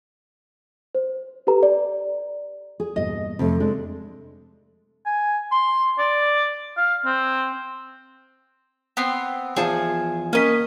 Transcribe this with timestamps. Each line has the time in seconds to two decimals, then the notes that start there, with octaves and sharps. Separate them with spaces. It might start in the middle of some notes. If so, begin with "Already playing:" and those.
0.95 C5
1.47 G4 A4 B4 A#5
1.63 D5
2.80 G#4
2.96 E2 G2 A#2 D#5
3.39 F2 C3 A3
3.60 G#3 D4
5.06 G#5
5.52 C6
5.99 D5
6.77 F5
7.05 C4
8.97 B3 C4 C6
9.56 E2 F3 G#4 A5
10.33 A#3 C#4 A#4 D#5 B6